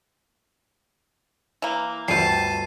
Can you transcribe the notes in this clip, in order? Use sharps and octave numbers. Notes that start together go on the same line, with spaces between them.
E3 A#3
G1 D2 C3 G3 A5 C7 D#7